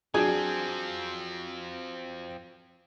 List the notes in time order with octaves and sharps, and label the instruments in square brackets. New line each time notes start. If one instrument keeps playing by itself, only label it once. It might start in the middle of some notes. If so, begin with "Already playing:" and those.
[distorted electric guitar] F3 C4 [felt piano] F#3 D4 [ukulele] G#4